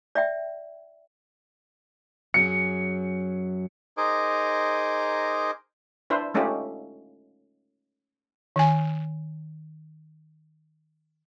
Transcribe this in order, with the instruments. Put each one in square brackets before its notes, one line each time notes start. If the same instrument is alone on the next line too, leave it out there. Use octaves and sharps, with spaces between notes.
[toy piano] D5 E5 G5
[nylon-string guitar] F#2 F#3 G#4 [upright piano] C#7
[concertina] D#4 G#4 A#4 C5 D#5 D6
[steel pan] D4 E4 B4 C5
G#3 A3 C#4 D#4 F4 G4
[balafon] D#3 G#5